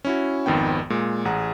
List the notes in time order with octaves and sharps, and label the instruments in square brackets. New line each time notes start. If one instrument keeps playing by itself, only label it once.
[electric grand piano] C#4 E4 F#4
G#1 F2 D#3 B3 G5
A#2 G#3
A1 G#4 F#5 A#5